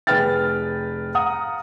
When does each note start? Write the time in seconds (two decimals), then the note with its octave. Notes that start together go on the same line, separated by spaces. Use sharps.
0.07 F1 G#4 B4 G5 F6 A6
1.15 F5 F#5 A#5 D#6